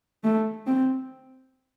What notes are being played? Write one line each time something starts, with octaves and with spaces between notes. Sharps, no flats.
A3
C4